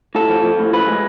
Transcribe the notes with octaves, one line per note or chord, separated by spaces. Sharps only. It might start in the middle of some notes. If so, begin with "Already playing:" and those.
A2 A4
F3
F3
A2
F3 B4
G#3